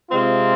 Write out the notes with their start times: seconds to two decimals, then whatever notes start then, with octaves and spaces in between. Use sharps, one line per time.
0.10 C3 G#3 C4 F4